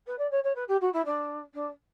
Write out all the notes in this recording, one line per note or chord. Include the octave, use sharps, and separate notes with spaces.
B4
D5
C#5
C#5
B4
G4
F#4
E4
D4
D4